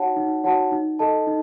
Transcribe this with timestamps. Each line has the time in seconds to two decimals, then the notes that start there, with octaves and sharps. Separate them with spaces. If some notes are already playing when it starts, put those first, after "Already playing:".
Already playing: D#4 F#4 C#5 F#5 A5
0.17 D#4
0.44 F#4 C#5 F#5 A5
0.72 D#4
0.99 A4 D#5 A5
1.27 D#4